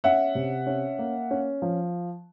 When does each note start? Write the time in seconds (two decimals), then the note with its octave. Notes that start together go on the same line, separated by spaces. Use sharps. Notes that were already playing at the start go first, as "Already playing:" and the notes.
0.04 C#4 E5 F#5
0.35 C3
0.67 C#4
0.99 A#3
1.31 C#4
1.62 F3